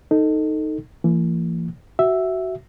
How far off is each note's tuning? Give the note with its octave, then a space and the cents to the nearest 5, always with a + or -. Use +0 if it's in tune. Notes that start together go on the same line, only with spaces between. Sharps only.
D#4 +0 A4 +15
E3 +35 A#3 -30
F#4 +15 E5 +0